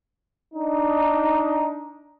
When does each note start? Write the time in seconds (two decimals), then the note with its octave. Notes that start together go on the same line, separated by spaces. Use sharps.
0.54 D4 D#4